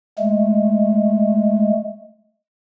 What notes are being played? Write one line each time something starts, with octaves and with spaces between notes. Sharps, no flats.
G#3 A3